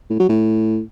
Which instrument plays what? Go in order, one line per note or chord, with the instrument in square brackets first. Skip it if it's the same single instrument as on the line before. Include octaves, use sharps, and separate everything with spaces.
[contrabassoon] A2
F#3
A2